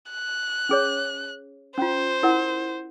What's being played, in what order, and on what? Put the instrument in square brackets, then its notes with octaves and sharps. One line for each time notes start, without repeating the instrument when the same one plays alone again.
[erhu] F#6
[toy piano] C#4 G#4 C#5
[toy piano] C#4 F4 [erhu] C5
[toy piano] E4 A#4 F#5